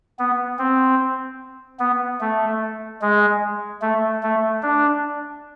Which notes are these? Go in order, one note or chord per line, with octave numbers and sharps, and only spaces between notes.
B3
C4
B3
A3
G#3
A3
A3
D4